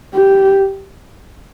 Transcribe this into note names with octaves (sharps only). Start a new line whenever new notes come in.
G4